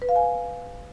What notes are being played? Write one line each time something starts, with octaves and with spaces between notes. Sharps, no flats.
B4
F5
G#5